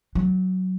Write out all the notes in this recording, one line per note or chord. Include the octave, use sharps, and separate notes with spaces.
F#3